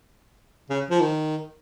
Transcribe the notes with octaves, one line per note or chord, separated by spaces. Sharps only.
C#3
F3
D#3